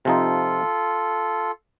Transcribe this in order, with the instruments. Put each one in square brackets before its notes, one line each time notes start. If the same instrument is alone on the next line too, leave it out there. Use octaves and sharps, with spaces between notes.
[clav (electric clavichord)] C3 F3 C4 D#4 [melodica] F4 A4